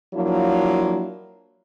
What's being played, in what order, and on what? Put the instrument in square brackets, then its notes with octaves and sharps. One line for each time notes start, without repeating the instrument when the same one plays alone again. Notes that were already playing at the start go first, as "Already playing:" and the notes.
[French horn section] F3 F#3 A#3 D4 E4 F4